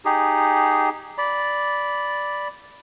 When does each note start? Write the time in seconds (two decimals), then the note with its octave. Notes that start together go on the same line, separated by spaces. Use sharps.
0.05 D#4 G4 G#4
1.18 D5 B5